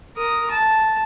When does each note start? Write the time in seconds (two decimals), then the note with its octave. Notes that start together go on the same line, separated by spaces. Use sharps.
0.17 A#4 D#6
0.50 A5